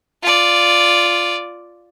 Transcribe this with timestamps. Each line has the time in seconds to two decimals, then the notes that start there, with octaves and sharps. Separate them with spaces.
0.23 F4 D5